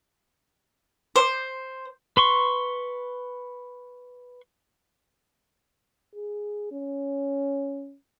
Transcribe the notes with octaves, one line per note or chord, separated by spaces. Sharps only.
C5
B4 C6 C#6
G#4
C#4